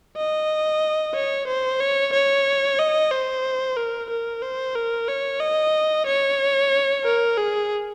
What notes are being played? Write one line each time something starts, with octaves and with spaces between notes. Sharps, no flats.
D#5
C#5
C5
C#5
C#5
D#5
C5
A#4
A#4
C5
A#4
C#5
D#5
C#5
A#4
G#4